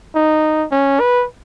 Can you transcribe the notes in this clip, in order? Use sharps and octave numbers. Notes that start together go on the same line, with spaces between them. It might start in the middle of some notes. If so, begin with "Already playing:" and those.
D#4
C#4
B4